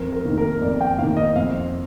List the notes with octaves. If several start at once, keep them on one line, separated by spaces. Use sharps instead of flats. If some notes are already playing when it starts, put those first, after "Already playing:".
Already playing: F2 A#4
A#4
D#3 A#3
A#4
F2 D5
G5
D#3 A#3 F5
D#5
F2 F5